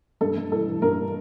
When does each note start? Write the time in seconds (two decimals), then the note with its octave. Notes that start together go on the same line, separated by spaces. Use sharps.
0.21 G2 A4
0.37 G2
0.52 E3 A4
0.67 E3
0.82 G2 A#4